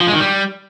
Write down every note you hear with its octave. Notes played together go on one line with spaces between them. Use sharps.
F3
G#3
D#3
G3